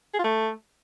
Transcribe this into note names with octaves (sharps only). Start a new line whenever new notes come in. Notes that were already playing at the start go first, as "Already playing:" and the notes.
G#4
F4
A3